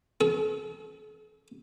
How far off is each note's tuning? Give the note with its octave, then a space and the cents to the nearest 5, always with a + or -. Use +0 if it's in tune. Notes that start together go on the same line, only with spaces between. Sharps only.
A4 -45